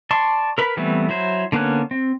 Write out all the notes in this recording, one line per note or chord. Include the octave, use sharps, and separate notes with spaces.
D5 A5 C6 C#6
A#4 B4 B5
E3 G3 A3 B3 C4
F#3 E4 C5
D3 A#3 B3 C#4 F#6
C4